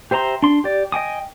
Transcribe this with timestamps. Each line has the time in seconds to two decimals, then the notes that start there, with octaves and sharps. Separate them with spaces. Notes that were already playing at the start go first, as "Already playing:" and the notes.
0.11 G4 C5 E5 A#5 C6
0.43 D4 C6
0.64 G4 D5
0.92 D#5 G5 G#5 D#6